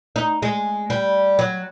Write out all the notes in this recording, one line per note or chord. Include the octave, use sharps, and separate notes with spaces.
D#4
G#3
G3
F#3